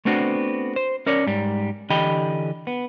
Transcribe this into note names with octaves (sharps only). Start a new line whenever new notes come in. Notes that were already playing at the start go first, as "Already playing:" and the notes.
A3 B3 C4 D4 F#4
C5
C#4 A#4 C#5 D5
G#2 G3
D3 E3 G4 D#5 G5 B5
B3